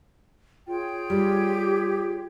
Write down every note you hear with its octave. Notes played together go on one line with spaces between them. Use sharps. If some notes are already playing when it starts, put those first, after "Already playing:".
F4 G#4 C#5 G5
G3 G4